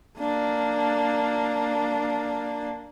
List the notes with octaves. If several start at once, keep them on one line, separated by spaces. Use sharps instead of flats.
A#3 D4